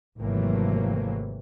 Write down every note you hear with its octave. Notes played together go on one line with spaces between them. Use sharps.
G#1 C3 E3 F#3 A3 A#3